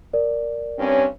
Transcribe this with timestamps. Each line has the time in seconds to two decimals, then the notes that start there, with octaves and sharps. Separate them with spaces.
0.13 A#4 D5
0.79 G2 C4 C#4